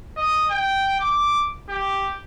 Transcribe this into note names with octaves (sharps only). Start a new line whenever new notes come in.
D#5
G5
D6
G4